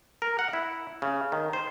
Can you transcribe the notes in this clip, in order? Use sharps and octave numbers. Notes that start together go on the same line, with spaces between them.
A#4
F#5
E4
C#3
D#3
C5